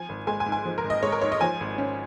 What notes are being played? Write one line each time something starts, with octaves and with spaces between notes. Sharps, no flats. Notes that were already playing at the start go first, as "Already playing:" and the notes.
Already playing: F3 G#5
G#1
G#3 G#5
G#5
G#2
G#5
F3
A#4
G#1
D#5
G#3 C#5
A#4
G#2 C#5
D#5
F3 G#5
G#1
C#4